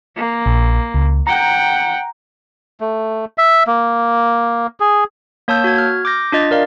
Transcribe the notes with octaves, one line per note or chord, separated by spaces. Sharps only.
A#3
A#1
C#2
F#5 G5 A#5
A3
E5
A#3
G#4
A#3 C#5 A5 E6 G6
F#4 G#6
F6
D6 G6 A#6
D4 F4 D#5 A6
A#4 D5 F5